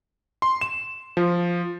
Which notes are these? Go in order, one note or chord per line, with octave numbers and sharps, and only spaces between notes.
C6
E7
F3